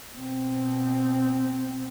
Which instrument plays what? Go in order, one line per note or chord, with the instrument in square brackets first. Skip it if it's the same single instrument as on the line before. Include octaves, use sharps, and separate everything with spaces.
[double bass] B2 C4